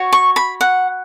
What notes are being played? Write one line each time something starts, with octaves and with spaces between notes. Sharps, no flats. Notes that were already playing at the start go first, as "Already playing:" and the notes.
Already playing: F#4 C#5
C#6
B5
F#5